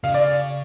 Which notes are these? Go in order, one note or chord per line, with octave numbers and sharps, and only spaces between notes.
C#3 F5
D5